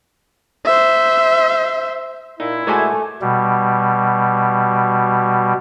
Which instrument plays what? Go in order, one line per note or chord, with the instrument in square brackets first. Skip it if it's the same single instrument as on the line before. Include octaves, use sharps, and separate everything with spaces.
[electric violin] C5 E5
[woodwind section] A#2 E4 [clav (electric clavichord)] D#4
[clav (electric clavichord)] G#3 F#4 C5 [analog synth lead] A3 [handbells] G#5 D6 G#6
[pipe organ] B2 G3